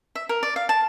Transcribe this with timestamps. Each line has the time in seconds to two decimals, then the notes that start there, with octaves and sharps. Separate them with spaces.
0.15 E5
0.29 A#4
0.43 D5
0.56 F5
0.69 A5